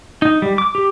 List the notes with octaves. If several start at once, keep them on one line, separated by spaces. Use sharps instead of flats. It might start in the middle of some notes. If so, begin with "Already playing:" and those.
D#4
G3
D6
G4